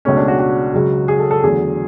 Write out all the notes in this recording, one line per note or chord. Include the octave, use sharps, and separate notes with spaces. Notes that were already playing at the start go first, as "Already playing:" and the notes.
C#2 B2 A3 C#4
D4
F#4
F#4
C#2 C#3 F#3
G#4
A4
A4
E2 D3 F#3 A3 G#4